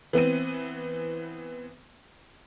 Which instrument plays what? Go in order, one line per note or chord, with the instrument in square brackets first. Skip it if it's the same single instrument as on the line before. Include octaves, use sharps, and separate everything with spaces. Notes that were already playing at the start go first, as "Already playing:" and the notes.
[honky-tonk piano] E3 B3 C4 D#7